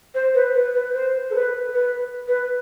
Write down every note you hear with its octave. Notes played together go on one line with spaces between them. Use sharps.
C5
B4
B4
B4
C5
A4
B4
B4
B4